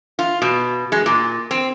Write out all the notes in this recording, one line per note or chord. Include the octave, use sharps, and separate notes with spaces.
F4
B2
G#3
A#2
C4